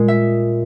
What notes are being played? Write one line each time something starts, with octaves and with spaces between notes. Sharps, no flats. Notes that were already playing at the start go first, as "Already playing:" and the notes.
Already playing: A#2 G#3
E5